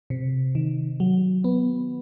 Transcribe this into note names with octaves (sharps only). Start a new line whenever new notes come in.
C3
D#3
F#3
B3